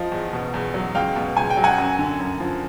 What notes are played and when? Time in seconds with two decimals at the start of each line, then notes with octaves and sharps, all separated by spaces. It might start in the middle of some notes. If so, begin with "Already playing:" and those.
Already playing: F3 D#5 F5
0.12 E2
0.33 B2
0.54 E2
0.74 F#3
0.95 C#2 F5 G5
1.16 B2
1.36 C#2 G#5
1.50 G5
1.57 F#3
1.64 F#5 G#5
1.78 F#2
1.99 D3
2.20 F#2
2.40 F3